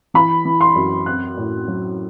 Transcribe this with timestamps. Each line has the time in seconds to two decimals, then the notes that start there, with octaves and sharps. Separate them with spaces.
0.14 E3 B5
0.45 E3
0.61 C6
0.75 F#2
1.06 C4 F#6
1.37 A2
1.68 F#3